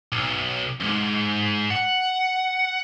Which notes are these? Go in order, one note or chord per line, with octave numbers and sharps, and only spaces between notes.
B1
F2 G#2
F#5